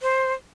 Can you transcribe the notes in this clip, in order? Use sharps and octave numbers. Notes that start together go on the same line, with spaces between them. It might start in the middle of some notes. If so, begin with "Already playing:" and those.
C5